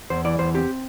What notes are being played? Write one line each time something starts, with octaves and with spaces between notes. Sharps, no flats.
E2 C5
E3 D5
E2 C5
C4 G4